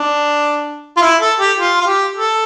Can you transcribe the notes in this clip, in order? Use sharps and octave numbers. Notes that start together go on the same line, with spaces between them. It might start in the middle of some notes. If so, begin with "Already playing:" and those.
Already playing: D4
F4
E4
A4
G4
F4
F4
G4
A4